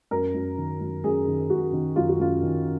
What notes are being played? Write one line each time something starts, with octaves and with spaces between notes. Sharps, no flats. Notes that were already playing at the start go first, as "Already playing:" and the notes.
F#2 A#4
F#2
D#3
F#2
F#2 G#4
D#3
F#2 F#4
D#3
F#2 F4
F#4
F#2 F4
D#3